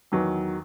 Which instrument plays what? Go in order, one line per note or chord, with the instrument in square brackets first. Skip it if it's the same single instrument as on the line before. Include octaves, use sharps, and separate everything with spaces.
[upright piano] E2 D#3 F#3